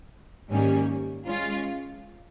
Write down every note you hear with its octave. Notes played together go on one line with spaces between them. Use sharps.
G#2 D#3 G3 A#3 C#4
G#3 C#4 F4